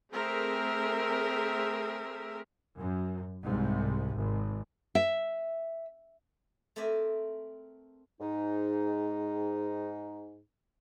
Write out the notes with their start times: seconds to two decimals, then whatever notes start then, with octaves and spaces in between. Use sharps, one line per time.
0.12 A3 C4 G#4 A#4 E5
2.76 F#2
3.43 C2 G#2 C3
4.14 G#1
4.95 E5
6.76 A3 C4 A#4 D5 E5 G#5
8.20 G#2 D#4